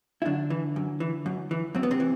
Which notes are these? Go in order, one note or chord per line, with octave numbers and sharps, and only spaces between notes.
E4
F#2 D3 D4
E3
F#2
E3
F#2
E3
F#2 C4
B3
C3 C4
E3